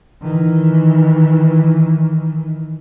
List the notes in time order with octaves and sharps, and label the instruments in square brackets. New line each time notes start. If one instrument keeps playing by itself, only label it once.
[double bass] D#3 E3